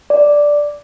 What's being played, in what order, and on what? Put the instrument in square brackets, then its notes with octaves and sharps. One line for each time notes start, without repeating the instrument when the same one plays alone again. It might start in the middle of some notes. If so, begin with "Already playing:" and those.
[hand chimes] D5